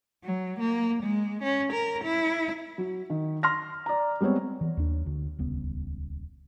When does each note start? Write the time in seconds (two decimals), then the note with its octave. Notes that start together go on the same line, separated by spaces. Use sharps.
0.24 F#3
0.59 A#3
1.03 G#3
1.43 C#4
1.73 A#4
2.04 E4
2.78 F#3
3.10 D#3
3.43 C6 F6 A#6
3.86 D5 A#5
4.21 G3 G#3 B3 C4 C#5
4.61 E3
4.77 D#2 D4
5.06 D2
5.38 D#1 C#2 B3